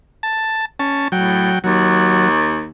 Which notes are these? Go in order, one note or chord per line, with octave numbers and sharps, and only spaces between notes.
A5
C#4 A5
A2 F#3 G5
D#2 F#3